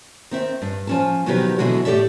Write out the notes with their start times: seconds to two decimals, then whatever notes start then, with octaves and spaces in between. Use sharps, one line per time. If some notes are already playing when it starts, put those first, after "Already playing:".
0.31 D#3 C4 E5
0.62 G2
0.87 F3 C#4 A5
1.26 B2 D#3 F3 F#3 G4 B4
1.58 B2 D3 E3 F#3 G#3 F#4
1.85 A2 G4 A4 D5 E5